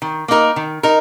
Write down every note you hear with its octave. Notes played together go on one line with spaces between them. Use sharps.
D#3
A#3 D#4 A#4
D#3
D#4 A#4